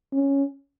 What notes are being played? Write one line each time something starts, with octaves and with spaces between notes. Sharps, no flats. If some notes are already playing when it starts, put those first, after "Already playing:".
C#4